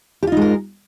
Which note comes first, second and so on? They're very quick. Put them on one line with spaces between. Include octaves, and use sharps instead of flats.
G4 F4 D#4 G#3 A#4